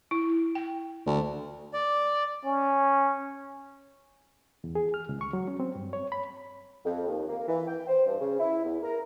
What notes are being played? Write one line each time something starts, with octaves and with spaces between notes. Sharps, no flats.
E4
G5
D2
D5
C#4
E2
G#4
F6
C#2
C#6
F#3
C#4
C4
G2
C#5
B5
F2
D#2
A#3
E3
G5
C5
G2
C#3
E4
E2
A#4